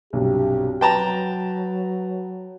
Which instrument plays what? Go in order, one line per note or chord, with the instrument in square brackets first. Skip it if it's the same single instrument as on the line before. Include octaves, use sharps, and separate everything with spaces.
[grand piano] B1 G2 C3 [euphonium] G4
[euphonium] F#3 [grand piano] B4 [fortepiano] G5 A5 A#5